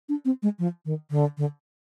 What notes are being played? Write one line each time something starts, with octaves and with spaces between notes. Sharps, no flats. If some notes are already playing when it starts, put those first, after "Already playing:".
D4
C4
G#3
F3
D#3
D3
D3